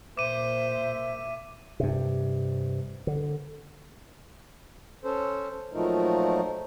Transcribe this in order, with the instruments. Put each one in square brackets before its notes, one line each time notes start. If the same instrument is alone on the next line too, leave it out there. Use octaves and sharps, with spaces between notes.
[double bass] A#2 [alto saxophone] C5 [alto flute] E5 [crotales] D6 D#7
[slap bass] G2 C3
D3
[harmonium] C#4 A4 C5
A#2 F3 F#3 A3 D#4 A#4